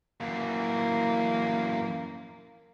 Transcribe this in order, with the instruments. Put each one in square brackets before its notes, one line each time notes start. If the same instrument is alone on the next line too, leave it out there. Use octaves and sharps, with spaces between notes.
[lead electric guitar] F#2 E3 [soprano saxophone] A#3